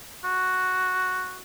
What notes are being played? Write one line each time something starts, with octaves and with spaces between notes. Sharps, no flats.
F#4